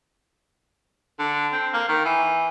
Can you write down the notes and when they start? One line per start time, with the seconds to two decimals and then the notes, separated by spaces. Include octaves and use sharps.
1.19 D3
1.53 C4
1.73 A#3
1.89 D#3
2.05 E3